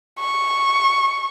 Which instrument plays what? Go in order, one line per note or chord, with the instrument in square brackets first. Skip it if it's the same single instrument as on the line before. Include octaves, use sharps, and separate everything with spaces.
[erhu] C#6